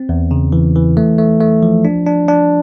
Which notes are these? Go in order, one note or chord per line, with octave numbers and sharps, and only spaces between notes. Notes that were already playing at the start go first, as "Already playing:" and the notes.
Already playing: C4
E2
C#3
E3
E3
A3
A3
A3
F3
D4
D4
D4